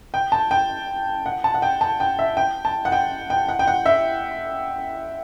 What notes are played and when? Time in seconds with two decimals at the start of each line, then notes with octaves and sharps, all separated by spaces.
0.14 G5
0.32 A5
0.51 G5
1.26 F#5
1.44 A5
1.54 F#5
1.62 G5
1.81 A5
2.00 G5
2.19 E5
2.37 G5
2.65 A5
2.85 F#5
2.92 G5
3.30 G5
3.48 F#5
3.59 G5
3.67 F#5
3.86 E5